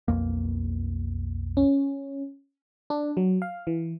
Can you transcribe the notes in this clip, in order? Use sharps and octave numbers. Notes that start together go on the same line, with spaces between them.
B1 F2 A#3
C#4
D4
F#3
F5
E3